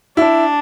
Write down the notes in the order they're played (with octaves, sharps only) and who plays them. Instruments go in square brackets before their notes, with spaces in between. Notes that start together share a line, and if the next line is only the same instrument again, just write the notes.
[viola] D4 [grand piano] E4